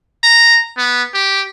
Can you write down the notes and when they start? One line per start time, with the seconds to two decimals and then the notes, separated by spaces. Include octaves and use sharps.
0.23 A#5
0.77 B3
1.14 G4